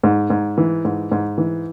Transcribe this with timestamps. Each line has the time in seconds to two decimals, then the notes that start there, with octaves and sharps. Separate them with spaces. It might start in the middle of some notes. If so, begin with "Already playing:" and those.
0.03 G#2
0.30 G#2
0.58 E3
0.85 G#2
1.11 G#2
1.38 E3